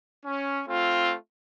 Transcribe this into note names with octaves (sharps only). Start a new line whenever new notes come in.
C#4
A3 C4 F4